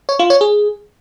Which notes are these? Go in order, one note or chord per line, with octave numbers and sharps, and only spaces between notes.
C#5
F4
C#5
G#4